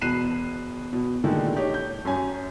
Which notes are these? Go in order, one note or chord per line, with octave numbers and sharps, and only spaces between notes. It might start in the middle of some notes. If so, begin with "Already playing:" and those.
E1 B2 F#6 C7 D#7 E7
B2
A#2 D3 D#3 G#3 A3
D#4 G4 C#5
G6
F#2 C#4 G#5